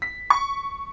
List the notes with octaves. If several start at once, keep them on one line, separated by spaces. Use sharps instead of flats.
B6
C#6